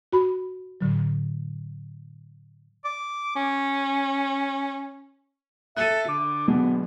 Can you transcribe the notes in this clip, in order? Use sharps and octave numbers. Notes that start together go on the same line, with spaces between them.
F#4 B5
A2 D3 F#3
D6
C#4
A4 E5 F#6 D#7
D3 D6
B2 F#3 G#3 B3